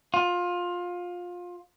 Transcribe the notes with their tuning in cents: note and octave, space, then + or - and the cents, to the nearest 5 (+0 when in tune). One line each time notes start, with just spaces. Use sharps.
F4 +20